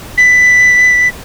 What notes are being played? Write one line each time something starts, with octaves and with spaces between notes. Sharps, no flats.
B6